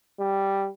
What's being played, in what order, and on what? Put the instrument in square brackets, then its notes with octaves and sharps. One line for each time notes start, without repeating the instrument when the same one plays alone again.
[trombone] G3